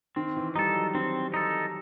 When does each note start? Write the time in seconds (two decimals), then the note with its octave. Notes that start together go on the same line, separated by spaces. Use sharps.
0.16 D#3 C4
0.36 E3
0.56 G3 D#4 A4
0.76 F#3
0.94 D#3 C4
1.34 D#4 A4